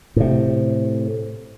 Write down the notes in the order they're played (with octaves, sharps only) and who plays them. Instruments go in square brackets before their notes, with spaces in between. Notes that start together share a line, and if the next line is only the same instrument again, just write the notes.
[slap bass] A2 C3